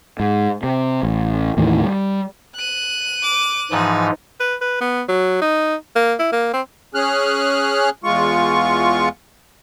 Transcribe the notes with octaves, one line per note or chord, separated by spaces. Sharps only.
G#2
C3
A1
D#2 A2 D#3 E3
G3
F#6 D#7
D6
G#2 E3 F3 D#4
B4
B4
B3
F#3
D#4
A#3
E4
A#3
C4
C#4 G#4 F6 F#6
E2 G#3 F4 C#6